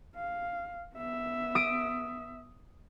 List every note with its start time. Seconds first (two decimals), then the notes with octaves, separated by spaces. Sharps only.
0.15 F5
0.95 B3 E5
1.55 D#6 D7